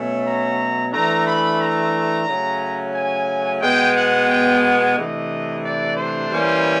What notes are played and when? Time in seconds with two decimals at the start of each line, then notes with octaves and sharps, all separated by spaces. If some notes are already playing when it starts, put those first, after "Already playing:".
Already playing: B2 F#3 A3 C#4
0.26 A#5
0.93 E3 A3 D4 A#5
1.27 B5
1.61 A#5
2.27 C#3 F#3 A3 C#4
2.94 G#5
3.62 B2 G#3 B3 G5
3.96 F#5
4.29 G5
4.63 F#5
4.97 C3 E3 A3 D4 D#5
5.64 D5
5.97 C5
6.30 E3 G3 A#3 C#4